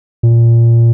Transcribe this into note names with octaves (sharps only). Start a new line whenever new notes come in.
A#2